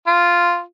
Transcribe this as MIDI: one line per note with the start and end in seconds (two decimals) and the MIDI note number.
0.07 0.61 65